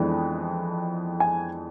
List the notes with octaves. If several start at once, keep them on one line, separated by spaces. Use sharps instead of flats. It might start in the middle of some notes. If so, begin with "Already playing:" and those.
Already playing: F2 E3 G#3 B3 D4
G#5